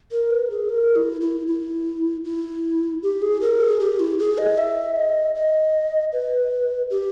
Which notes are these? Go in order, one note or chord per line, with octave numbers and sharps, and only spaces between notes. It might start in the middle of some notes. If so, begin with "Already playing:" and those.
A#4
B4
G#4
A#4
E4
E4
E4
E4
G4
G#4
A#4
G#4
G4
E4
G#4
D#5
E5
D#5
D#5
B4
G4